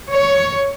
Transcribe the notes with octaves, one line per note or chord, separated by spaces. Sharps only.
C#5